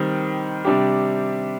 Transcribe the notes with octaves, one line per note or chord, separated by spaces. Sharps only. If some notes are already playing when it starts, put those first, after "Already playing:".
Already playing: D#3 G3 C4
C3 G3 D4 G4